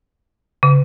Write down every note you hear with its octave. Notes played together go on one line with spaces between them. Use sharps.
C#3